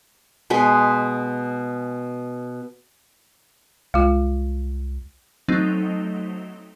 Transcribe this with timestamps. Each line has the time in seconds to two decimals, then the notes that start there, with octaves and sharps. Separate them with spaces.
0.50 B2 G#3 B4
3.94 C2 G#3 F4
5.48 F#3 A3 C4 D#4